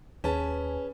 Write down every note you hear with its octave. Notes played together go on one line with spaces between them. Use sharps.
D#2 C#4 G#4 B4 A5